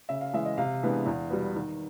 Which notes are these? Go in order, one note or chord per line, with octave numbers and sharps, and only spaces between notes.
C#3 E5
F5
E3 G#3 E5
D#5
C3 F5
E3 G#3 B3 D4
E2
B2 G3 B3
D#3